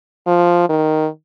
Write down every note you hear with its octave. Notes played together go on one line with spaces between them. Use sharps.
F3
D#3